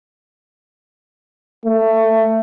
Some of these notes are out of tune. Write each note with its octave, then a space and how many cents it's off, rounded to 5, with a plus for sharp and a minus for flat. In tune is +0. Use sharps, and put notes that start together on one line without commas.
A3 +20